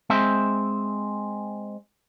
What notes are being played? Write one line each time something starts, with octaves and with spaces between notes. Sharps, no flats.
G#3 C4 E5